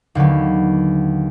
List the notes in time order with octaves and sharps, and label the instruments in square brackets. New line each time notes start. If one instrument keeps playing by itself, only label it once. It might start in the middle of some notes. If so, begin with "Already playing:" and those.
[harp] D#2 D3 F#3 B3